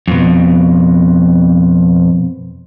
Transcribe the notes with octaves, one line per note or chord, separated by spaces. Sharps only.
F2 B2